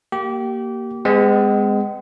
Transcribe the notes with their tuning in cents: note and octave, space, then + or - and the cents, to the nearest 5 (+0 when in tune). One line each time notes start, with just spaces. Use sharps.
A#3 +0 G4 -25
G#3 -15 B3 +45 D#5 +0